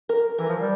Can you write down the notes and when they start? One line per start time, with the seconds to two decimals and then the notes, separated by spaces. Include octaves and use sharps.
0.09 A#4
0.38 E3 A#4
0.49 F3
0.59 G3